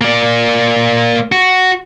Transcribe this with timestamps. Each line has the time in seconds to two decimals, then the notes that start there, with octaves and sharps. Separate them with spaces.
0.01 A#3 D5
1.32 F#4